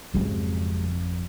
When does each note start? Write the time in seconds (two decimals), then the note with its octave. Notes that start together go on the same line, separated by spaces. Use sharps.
0.14 G#1 F2 C#3 F#3 G#3